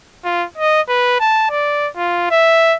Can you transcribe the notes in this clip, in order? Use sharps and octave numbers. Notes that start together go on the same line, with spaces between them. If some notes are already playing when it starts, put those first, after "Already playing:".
F4
D#5
B4
A5
D5
F4
E5